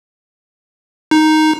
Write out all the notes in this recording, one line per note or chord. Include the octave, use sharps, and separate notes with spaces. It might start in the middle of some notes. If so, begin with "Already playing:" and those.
D#4